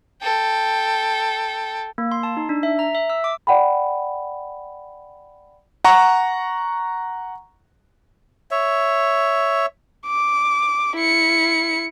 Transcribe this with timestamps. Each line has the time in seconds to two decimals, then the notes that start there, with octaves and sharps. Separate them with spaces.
0.22 A4 G5
1.98 A#3
2.12 C6
2.23 A5
2.37 D#4
2.49 D4
2.63 E5
2.79 A#5
2.95 E5
3.10 E6
3.24 D6
3.47 D5 F#5 G5 B5
5.84 F#5 A#5 C#6
8.51 C#5 E5
10.07 D6
10.96 E4 C#7